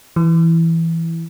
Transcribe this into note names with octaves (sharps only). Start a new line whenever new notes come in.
E3